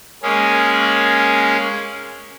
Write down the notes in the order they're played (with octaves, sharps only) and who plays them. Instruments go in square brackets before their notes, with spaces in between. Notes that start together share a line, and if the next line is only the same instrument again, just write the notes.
[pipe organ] G#3 A#3 C#4 G#4